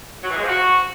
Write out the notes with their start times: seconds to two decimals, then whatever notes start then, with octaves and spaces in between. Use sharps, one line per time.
0.23 F#3
0.29 E3
0.35 G#3
0.41 F3
0.47 F#4